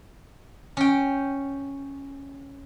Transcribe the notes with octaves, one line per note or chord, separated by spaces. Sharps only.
C#4 G5